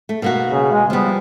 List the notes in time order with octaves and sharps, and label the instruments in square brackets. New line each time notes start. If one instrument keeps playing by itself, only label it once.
[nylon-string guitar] A3
B2 A#3 F#4
[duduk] C#3
G#3
[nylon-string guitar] F3 G3 [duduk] B3